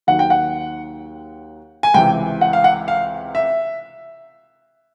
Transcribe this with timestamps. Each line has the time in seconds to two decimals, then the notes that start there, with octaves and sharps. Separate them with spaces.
0.07 D#2 D#3 F#3 F#5
0.19 G5
0.30 F#5
1.83 G#5
1.94 C#2 C3 E3 G5
2.41 F#5
2.53 F5
2.64 F#5
2.88 F5
3.35 E5